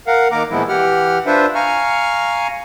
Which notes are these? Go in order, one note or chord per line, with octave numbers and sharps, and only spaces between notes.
A#4 F5 F#5
D#3 A#3 A#4 A#5 D6
A#2 E3 F3 G#3 B3 E4
E3 G4 F#5 F6
D4 F4 B4 C5 E5
F5 G#5 A#5 C#6 F6